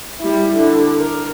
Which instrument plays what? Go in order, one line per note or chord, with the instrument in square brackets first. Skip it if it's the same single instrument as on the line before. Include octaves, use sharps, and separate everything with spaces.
[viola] G3 E4
D3
A#4